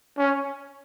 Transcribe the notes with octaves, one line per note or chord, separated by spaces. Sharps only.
C#4